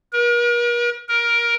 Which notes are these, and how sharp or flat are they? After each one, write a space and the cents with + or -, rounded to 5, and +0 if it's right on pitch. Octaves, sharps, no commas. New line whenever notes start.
A#4 +45
A#4 +15